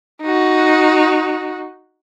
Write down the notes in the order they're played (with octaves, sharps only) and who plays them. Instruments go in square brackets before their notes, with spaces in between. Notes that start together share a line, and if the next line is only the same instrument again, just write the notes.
[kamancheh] D#4 F#4